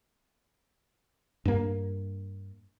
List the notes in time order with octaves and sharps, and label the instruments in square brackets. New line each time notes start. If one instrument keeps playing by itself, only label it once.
[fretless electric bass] G2 A#3